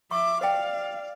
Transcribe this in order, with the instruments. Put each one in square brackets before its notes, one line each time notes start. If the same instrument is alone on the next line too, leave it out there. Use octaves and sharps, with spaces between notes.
[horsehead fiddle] E5 [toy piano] C#6 [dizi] D6
[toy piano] C5 G5 [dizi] D5 [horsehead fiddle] F5